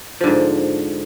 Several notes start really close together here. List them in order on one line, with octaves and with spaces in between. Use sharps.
F3 D3 G#2